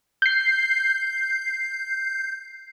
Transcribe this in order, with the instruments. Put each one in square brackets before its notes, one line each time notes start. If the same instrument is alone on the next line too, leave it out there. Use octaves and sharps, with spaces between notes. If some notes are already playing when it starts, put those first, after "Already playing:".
[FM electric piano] G6 C7